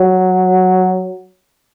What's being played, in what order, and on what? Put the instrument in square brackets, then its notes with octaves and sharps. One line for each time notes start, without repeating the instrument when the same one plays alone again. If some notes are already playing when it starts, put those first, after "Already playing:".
Already playing: [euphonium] F#3